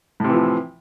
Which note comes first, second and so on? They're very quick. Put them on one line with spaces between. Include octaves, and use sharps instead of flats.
A2 C3 E3 F3